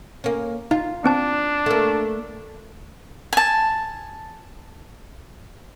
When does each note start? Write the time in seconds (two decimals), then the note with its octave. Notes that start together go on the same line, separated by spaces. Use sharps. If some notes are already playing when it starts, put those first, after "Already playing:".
0.24 A#3 C#4
0.71 D#4 F4
1.04 B3 C4 D4 A5
1.66 A3 A#3
3.33 G#5 A5